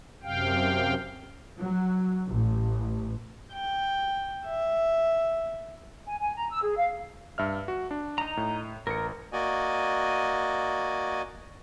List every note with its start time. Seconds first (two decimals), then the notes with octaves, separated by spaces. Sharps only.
0.23 F#2 C3 F5 G5
1.58 F#3
2.25 A1
3.53 G5
4.46 E5
6.07 G#5
6.20 G#5
6.37 A#5
6.51 E6
6.63 G#4
6.77 F5
7.38 G2 E5 F6
7.68 F#4
7.91 D4
8.18 D#4 A#5
8.37 A2
8.87 A1 A#4 C#7
9.33 A#3 F#4 D5 D#5 G#5